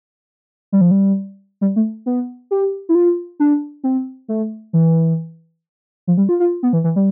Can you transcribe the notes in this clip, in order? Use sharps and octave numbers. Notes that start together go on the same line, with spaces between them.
G3
F3
G3
G3
A3
B3
G4
E4
F4
D4
C4
A3
E3
F3
G3
F4
F4
B3
E3
E3
G3